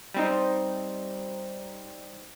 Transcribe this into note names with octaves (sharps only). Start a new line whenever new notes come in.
G3 C4 D#4